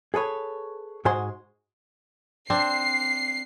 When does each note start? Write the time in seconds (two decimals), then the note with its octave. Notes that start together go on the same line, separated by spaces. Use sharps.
0.14 G#4 A4 B4 C#5
1.05 G#2 G#3 F#4 C5 G#5 C6
2.50 C4 D4 C7